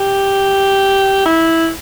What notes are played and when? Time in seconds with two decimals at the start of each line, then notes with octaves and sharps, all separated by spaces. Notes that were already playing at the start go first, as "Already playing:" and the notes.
Already playing: G4
1.25 E4